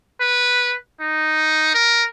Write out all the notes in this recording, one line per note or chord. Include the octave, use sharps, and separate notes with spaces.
B4
D#4
A#4